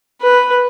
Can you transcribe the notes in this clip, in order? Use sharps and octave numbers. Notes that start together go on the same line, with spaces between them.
B4